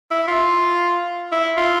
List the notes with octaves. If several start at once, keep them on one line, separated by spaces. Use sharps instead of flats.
E4
F4
E4
F4